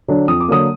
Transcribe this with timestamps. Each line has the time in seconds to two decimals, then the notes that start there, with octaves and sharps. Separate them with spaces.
0.08 D3 F#3 D4
0.28 F2 D#6
0.40 D6
0.48 D3 F#3 A#3 D#6